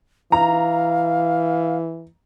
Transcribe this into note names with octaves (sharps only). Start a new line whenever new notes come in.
E3 F5 A#5